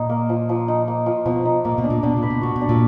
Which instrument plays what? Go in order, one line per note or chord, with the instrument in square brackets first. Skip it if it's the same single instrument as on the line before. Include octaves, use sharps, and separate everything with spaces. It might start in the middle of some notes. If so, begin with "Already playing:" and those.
Already playing: [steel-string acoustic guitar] A#2 [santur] D#4
[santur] A#3
F3
F3
D#4
A#3
F3
[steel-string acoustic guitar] B2 [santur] F3
[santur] D#4
[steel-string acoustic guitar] A#2 [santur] A#3
[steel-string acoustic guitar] B2
[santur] D4
[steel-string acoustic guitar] A#2
[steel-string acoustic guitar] B2 [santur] D4
[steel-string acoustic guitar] A#2
[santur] B4
[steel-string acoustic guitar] B2
[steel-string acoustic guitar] A#2 [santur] F#4
[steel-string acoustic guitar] B2
[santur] D4
[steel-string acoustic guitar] A#2